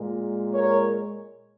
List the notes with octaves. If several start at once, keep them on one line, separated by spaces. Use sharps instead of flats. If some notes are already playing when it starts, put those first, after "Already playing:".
Already playing: A#2 G#3
A#4 C#5